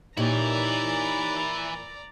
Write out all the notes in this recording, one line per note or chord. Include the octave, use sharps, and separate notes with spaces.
A#2 E3 D#4 E4 G4 C#5 D5 A#5